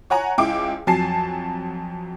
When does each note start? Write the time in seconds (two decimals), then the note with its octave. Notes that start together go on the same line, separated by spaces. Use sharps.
0.10 C#5 F#5 G#5 A#5
0.38 C#2 E4 G5 D6
0.87 F2 F#3 G#5 A5 C7